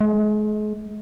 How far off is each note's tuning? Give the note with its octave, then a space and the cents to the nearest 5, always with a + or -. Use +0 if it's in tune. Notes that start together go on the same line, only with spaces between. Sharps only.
G#3 +35